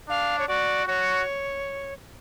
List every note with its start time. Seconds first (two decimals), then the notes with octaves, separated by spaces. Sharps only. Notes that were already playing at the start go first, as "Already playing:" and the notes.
0.09 D4 F5
0.39 C#5
0.48 F#4 D5
0.87 F#4 C#5